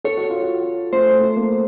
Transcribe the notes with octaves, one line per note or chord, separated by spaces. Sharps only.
A4 C#5
F#4
F4
F#4
A3 C5
A3
A#3